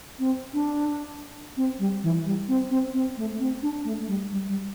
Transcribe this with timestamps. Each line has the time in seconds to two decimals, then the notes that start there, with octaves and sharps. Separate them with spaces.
0.19 C4
0.54 D4
1.57 C4
1.79 G3
2.03 E3
2.25 G3
2.48 C4
2.71 C4
2.94 C4
3.17 A3
3.40 C4
3.63 D4
3.85 A3
4.08 G3
4.32 G3
4.49 G3